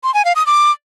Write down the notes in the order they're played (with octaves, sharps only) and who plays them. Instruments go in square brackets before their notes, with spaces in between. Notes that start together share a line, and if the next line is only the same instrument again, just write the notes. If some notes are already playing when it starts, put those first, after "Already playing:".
[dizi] C6
G#5
F5
D#6
D6